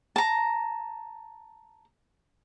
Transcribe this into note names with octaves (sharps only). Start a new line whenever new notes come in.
A5 A#5